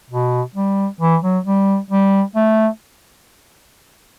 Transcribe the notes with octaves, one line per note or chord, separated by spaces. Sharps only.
B2
G3
E3
F#3
G3
G3
A3